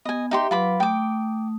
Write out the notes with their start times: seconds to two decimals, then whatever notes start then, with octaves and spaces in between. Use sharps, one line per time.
0.05 B3 D#5 G#5
0.31 D#4 G4 E5 C6
0.51 F#3 F4 B4 B5 D6
0.80 A3 G5 D6 D#6